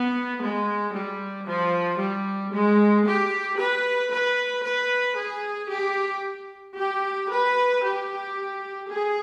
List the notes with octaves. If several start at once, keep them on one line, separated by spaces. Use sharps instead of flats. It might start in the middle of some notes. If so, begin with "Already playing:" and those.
Already playing: B3
G#3
G3
F3
G3
G#3
G4
B4
B4
B4
G#4
G4
G4
B4
G4
G#4